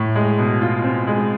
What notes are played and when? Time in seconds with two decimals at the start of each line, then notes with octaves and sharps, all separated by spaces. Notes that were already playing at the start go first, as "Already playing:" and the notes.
Already playing: A2
0.16 G#3
0.38 B2
0.61 F4
0.84 C4
1.07 G#3